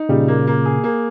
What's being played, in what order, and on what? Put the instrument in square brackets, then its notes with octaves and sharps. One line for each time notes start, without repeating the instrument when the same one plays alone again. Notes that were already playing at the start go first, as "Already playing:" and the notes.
Already playing: [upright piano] D#4
[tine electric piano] A#2 C#3 [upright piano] G3
[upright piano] A#3
A#3
G#4
A#3